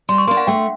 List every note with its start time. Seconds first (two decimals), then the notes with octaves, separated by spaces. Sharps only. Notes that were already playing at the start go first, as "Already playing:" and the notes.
0.09 G3 C6
0.18 C#6
0.27 A#3 D4 C6
0.37 F#5
0.47 A3 G5